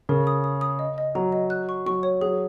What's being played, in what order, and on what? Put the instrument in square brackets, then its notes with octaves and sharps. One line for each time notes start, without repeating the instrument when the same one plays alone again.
[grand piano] C#3 [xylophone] A#4
[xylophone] D#6
D#6
D#6
D#5
D#5
[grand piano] F#3 [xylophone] A#5
[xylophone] D#5
F#6
C#6
[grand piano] F#3 [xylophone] C#6
[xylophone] C#5
[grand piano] F#3 [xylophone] G#4